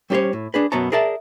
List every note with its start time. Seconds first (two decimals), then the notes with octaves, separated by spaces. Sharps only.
0.10 G3 C#4 G4 A4 C5 C#5
0.33 A2
0.54 D4 G#4 B4
0.72 F#2 B2 B3 C#5 A5 A#5
0.92 G#4 A#4 D5 E5 A5